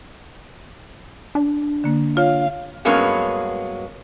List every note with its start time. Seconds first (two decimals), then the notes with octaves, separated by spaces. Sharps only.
1.35 D4
1.84 D3 A#3
2.17 F4 C#5 F5
2.85 G2 F#3 G#3 A#3 B3 C#4